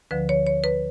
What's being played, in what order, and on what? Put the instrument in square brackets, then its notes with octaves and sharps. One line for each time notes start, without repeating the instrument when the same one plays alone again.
[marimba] D2 D3 F3 B4
C#5
C#5
B4